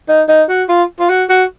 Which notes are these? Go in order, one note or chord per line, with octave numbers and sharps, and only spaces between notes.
D#4
D#4
F#4
F4
F4
F#4
F#4